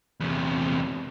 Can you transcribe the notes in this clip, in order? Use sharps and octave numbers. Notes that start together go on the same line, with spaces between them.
E2 C3